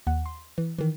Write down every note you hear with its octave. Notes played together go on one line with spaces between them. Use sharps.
D#2 F#5
C6
E3
D#3 E3